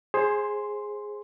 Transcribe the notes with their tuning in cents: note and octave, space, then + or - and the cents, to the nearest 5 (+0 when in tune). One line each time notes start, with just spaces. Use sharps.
G#4 +0 C5 +25 C6 +0